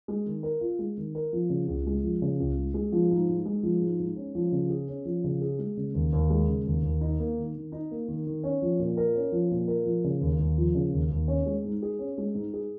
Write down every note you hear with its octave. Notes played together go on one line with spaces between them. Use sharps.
G#3
D#3
A#4
F4
G#3
D#3
A#4
F3
C#3
C#2
G#3
F3
C#3
C#2
G#3
G#3
F3
G#2
G#2
G#3
F3
G#2
G#2
C#4
F3
C#3
G#4
C#4
F3
C#3
G#4
G#3
C#3
D#2
D#2
G#3
C#3
D#2
D#2
D#4
A#3
D#3
D#3
D#4
A#3
D#3
D#3
C#4
F3
A#2
A#4
C#4
F3
A#2
A#4
F3
C#3
D#2
D#2
F3
C#3
D#2
D#2
C#4
G#3
G#2
G#4
C#4
G#3
G#2
G#4